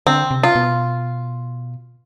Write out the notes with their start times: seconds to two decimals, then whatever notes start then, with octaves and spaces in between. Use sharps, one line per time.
0.07 D3 C4
0.31 C3
0.43 F4
0.55 B2